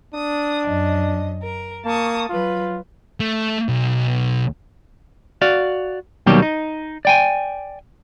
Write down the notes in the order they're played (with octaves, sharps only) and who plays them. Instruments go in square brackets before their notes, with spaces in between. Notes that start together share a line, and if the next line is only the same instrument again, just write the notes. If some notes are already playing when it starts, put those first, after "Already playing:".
[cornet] D4 [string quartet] D#6
[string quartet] F#2 D#5
A#4
[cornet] A#3 [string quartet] A5 C#6 D#6
[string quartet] F#3 B4 [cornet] F4
[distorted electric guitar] A3
B1
[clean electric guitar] F#4 D5 F5
D#2 B2 F#3 G3 A#3 G4
D#4
D5 G5 G#5